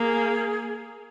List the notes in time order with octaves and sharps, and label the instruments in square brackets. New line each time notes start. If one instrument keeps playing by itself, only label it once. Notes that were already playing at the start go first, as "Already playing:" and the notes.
Already playing: [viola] A#3 [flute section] G#4